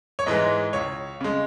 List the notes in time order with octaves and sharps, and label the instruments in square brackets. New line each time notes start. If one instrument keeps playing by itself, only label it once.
[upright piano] C#5
G#2 E3 G#3 D#5
C#2 C#5
C#3 G#3